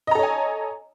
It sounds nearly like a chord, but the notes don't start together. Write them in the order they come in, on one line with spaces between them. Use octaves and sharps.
D#5 A#5 A4 C#5 G#5